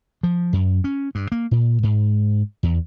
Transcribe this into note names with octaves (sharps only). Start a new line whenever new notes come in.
F3
F#2
C#4
G2
A#3
A#2
G#2
E2